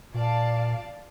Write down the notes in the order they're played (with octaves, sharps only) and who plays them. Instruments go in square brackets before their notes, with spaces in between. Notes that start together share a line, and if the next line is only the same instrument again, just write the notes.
[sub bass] A#2 [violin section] D5 F5 A5